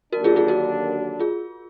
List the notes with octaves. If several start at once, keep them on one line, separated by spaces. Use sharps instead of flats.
D#2 D3 F#3 D4 F#4 A#4
F4 G#4
F4 G#4
F#4 A#4
F4 G#4